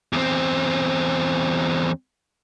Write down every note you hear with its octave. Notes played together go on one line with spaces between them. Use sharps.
E2 C4